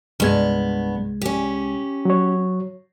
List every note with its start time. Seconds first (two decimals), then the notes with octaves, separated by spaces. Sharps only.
0.20 C2 G2 G#3 B3 G#6
1.21 C#4 G4
2.05 F#3 C#5